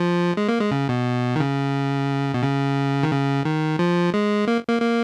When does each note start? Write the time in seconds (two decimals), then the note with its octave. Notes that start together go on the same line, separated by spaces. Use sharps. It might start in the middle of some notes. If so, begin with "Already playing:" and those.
Already playing: F3
0.37 G#3
0.48 A#3
0.60 G#3
0.71 C#3
0.89 B2
1.36 D#3
1.40 C#3
2.34 B2
2.43 C#3
3.03 D#3
3.11 C#3
3.45 D#3
3.79 F3
4.14 G#3
4.48 A#3
4.68 A#3
4.81 A#3